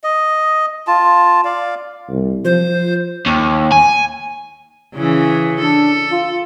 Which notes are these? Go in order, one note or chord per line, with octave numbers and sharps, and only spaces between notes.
D#5
F4 A5
D5 F5
C2
F3 C5
D#2
G#5
C#3 E3
D4 A4
F4